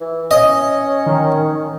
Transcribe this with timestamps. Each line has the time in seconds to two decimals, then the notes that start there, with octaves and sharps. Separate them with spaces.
0.01 E3
0.31 C#4 D#5
1.06 D#3